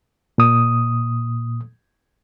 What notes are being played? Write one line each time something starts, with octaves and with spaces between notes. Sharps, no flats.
A#2 D#6